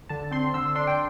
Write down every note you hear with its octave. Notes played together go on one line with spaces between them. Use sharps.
D3 A5
C4 C6
D3 E6
D4 C6
G5